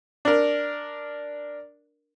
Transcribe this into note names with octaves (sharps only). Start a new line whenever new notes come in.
D4 A#4